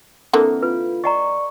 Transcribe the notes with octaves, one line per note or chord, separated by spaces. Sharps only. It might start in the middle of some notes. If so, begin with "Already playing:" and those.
D3 E3 A#3 C4 A4
F4 B4
D5 D#5 F#5 A#5 C#6